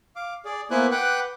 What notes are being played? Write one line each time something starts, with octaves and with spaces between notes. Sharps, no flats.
F5 D6
G#4 D5
A#3 B3 E4 C5 G#5 F#6
B4 F#5 G5 D6 F#6